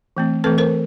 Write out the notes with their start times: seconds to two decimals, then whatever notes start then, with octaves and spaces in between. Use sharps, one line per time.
0.17 E3 A3 C4
0.44 E3 A3 C4 A4 B4
0.58 A#4 C5